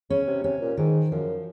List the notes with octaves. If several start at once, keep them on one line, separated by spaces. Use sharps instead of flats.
C#3 C#4
C3
C3 C#4
A#2
G#2 D#3
F#2 F3